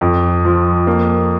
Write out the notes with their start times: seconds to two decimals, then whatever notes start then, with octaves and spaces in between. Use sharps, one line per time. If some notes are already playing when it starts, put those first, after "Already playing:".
0.01 F2
0.45 F3
0.87 A#3